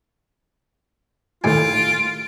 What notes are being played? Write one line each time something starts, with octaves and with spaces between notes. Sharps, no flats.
D#2 A2 F4 G#5 D7